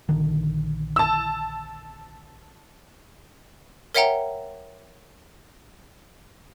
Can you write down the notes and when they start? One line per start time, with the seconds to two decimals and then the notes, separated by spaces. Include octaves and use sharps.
0.09 A#1 D3 D#3
0.96 A5 E6
3.95 A#4 C#5 E5 F#5 G5 A#5